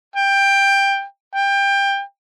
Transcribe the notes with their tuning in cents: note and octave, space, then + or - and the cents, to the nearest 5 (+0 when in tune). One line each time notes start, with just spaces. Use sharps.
G5 +15
G5 +20